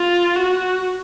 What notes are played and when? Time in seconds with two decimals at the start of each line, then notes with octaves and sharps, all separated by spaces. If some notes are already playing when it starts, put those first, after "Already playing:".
Already playing: F4
0.36 F#4